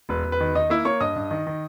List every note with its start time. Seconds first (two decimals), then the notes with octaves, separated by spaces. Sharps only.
0.09 E1 B4
0.25 E1
0.32 B4
0.41 D#3
0.55 D#3 D#4 D#5
0.70 A#3 E4 E5
0.85 A#3 C#5 C#6
1.01 G2 D#5 D#6
1.16 G2
1.31 D#3
1.47 D#3